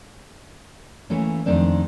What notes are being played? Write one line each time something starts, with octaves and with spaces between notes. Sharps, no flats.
E3 A3 A#3 C#4
F2 D#3 G#3 C4 D4